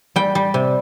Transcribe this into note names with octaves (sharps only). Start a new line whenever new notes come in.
G3 G5
G3
C3